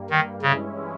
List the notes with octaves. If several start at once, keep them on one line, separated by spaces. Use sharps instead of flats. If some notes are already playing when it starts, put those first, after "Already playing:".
Already playing: G2 G3 A#3
D#3
G2 C#3 E3 G#3 C#4 E4